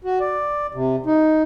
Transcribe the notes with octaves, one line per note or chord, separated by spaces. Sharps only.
F#4
D5
C3
D#4